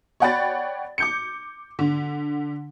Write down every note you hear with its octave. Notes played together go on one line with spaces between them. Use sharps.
C#5 D5 F#5 G5 B5 A6
D6 G6 C#7
D3